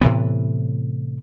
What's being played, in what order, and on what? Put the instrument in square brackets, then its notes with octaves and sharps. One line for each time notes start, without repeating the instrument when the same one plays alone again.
[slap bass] A2 C3 E3 B3